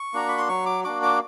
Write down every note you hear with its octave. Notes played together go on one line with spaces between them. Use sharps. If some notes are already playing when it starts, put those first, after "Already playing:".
Already playing: C#6
A#3 D4 F#4 A#5
B5
C6
F#3 C#6
D6
A#3 D4 F#4 D6
D6